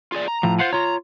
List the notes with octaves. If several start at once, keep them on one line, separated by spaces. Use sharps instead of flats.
F4 G#4 D5
A#5
A2 F3
F4 C5 F5 F#5
F4 C#5 A#5